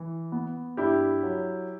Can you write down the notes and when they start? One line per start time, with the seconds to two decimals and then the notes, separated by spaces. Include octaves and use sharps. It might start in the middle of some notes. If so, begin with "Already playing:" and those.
Already playing: E3
0.32 B3
0.77 G2 E4 G4
1.23 F#3